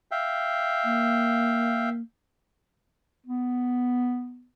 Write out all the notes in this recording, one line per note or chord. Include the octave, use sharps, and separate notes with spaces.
E5 F5 G5
A#3
B3